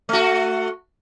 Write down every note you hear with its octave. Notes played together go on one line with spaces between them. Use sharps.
A3 F#4